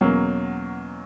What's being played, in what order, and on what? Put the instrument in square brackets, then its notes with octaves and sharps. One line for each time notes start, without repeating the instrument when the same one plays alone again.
[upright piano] E2 B2 F#3 A#3 C#4